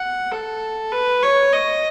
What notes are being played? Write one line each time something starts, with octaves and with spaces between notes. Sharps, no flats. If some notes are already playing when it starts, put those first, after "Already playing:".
Already playing: F#5
A4
B4
C#5
D#5